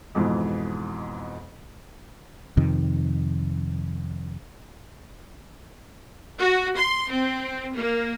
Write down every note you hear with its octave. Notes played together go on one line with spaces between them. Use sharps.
F2 G#2 B2 E3
F2 C3 D#3
F#4
C6
C4
A#3